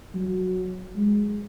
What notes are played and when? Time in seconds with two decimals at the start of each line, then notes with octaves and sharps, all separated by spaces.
0.15 F#3
0.95 G#3